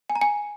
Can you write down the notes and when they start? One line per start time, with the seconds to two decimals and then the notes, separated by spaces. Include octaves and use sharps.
0.10 G#5
0.15 A#5
0.21 G#5